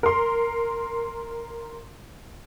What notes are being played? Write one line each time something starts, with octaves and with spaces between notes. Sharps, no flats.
A#4 C6